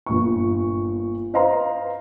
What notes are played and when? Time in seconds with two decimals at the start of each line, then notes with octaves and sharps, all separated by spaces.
0.06 G1 A#2 C#6
1.34 B4 C5 D#5 F5 A#5 C6